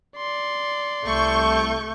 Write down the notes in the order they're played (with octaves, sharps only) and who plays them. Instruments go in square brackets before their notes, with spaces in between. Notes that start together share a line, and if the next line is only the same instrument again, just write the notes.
[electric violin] D5 C6
[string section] C2 C#6 G6 [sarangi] A3